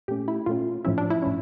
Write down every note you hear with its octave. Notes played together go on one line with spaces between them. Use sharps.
A#2 A3 C#4 G4
E4
A#2 A3 C#4 F4
A2 F3 C#4 E4
D4
E4
A2 F3 C#4